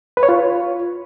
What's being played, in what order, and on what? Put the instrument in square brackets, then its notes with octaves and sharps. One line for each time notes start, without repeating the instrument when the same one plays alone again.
[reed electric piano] B4
C#5
F4